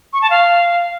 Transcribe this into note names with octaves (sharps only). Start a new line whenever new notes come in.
C#6
A5
F5